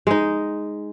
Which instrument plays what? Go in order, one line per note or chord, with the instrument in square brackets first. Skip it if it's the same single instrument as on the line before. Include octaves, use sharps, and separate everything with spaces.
[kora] G#3 D#4